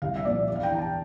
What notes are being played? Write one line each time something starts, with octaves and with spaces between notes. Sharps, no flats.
C2 F5
E5
A#2 F3 D5
E2 D5
F5
G5
E3 A#5
A5